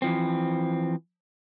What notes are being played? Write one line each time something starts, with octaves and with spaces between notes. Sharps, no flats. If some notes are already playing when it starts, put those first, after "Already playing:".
E3 F3 C4